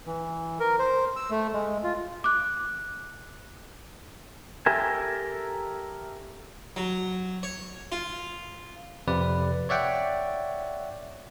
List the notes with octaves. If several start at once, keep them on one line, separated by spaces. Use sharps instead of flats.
E3
A#4
C5
E6
A3
G#3
F4
D6 F#6
G4 A4 A#4 E5 G#5
F#3
C#5
F4
F2 C3 B4 D5
C#5 D5 E5 F#5 G5